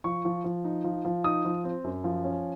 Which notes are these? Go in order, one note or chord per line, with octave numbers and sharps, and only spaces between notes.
F3 C#6
F3
F3
D#4
F3
F3
D#4 D#6
F3
C4
F#2
F3
C#4